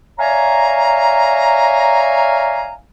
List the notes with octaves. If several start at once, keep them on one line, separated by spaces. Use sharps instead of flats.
C#5 D5 E5 F5 G#5 A#5